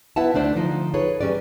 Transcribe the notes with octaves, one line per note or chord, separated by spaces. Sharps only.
B3 E4 B4 E5 F#5 A5
D2 A3 D4 C5 D5
D3 F3 D#4 F4
G#4 A4 B4 C#5
D#3 G3 C#4 B4 D5